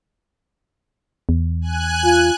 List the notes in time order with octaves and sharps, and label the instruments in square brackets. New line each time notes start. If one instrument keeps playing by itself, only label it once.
[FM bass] E2
[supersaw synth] G#5 F#6
[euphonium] F4